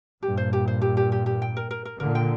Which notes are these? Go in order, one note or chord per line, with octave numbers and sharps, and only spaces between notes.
G2 A#2 G4
C5
G4
C5
G4
G4
G4
G4
G5
A#4
A#4
A#4
A#2 D3 A#4
G5